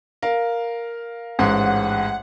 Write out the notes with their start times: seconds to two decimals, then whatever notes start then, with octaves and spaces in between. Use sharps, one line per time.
0.22 A#4 F5
1.39 A1 G#2 F#5